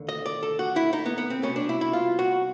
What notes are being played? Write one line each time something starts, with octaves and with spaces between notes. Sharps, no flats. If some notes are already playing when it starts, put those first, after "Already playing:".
Already playing: D#2 D3
D#5
D5
A4
F#4
E4
D#4
B3
B3
C4
C2 B2 C#4
D4
E4
E4
F4
F#4